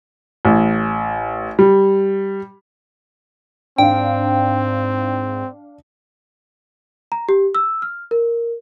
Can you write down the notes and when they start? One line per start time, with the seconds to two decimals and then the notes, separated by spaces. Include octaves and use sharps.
0.45 A1
1.59 G3
3.78 G#2 C4 D4 F5 G5
7.12 A#5
7.29 G4
7.55 E6
7.82 F6
8.11 A#4